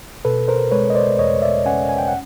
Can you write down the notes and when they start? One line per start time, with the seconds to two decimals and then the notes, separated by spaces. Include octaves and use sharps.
0.25 B2 A4 B4
0.48 A#4 C5
0.71 G#3 B4 C#5
0.90 D#5
0.95 C5 D5
1.19 E2 C#5 D#5
1.42 D5 E5
1.66 C#4 F#5 G#5
1.89 G#5
1.98 G5
2.08 F#5